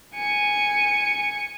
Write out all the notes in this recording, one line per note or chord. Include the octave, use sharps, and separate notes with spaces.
G#5 C#7